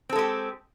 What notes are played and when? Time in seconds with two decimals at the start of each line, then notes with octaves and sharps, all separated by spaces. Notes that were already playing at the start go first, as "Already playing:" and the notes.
0.09 C4
0.12 A4
0.16 G#3
0.19 G4